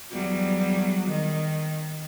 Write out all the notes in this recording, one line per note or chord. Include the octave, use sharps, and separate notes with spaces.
E2 F#3 G3
D#3